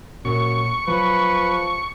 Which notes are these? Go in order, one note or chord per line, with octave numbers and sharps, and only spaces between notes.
F#2 A#2 C#6
F3 F#3 B4